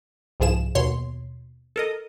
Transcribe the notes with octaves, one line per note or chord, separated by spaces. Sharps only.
C2 G#2 F3 G#4 E7
D#2 B2 C#5 C6
A4 A#4 D#5